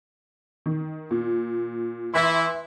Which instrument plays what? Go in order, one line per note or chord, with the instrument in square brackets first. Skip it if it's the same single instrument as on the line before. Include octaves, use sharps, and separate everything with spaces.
[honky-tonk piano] D#3
A#2
[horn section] E3 E4 [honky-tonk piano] E5 C6